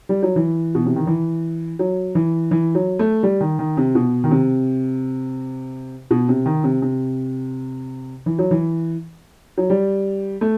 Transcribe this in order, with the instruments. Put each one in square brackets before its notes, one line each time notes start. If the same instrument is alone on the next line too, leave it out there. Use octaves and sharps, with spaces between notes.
[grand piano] G3
F#3
E3
B2
C3
D#3
E3
F#3
E3
E3
F#3
A3
G3
D#3
D#3
C3
B2
D#3
C3
B2
C3
D#3
C3
C3
E3
F#3
E3
F#3
G3
A3